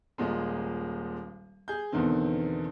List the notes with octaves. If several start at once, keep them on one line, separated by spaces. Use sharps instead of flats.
D#1 A#2 G#3
G#4 G6
E2 B2 D3 D#3 C4